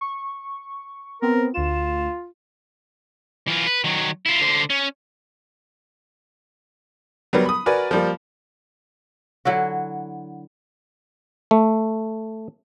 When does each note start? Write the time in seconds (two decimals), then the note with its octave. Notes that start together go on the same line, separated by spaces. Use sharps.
0.01 C#6
1.22 B3 C4 A#4
1.54 D2 F4 E7
3.47 E3 F4
3.66 B4
3.84 D#3 F#3
4.26 E4 F4
4.41 D3 C5
4.70 C#4
7.33 F#3 G3 B3 A#4
7.46 B5 D#6
7.66 F#4 A#4 B4 D5 G#5
7.91 F3 G3 A#3
9.45 D3 F#3 E4 F#4
11.51 A3